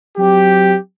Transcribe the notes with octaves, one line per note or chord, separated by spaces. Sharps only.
F#3 C4 G4